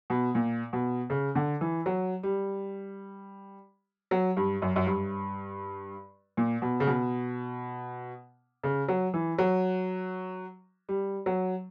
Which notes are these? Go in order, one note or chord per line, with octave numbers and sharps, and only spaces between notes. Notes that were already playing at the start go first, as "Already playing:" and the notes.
B2
A#2
B2
C#3
D3
E3
F#3
G3
F#3
G2
F#2
F#2
G2
A#2
B2
C#3
B2
C#3
F#3
E3
F#3
G3
F#3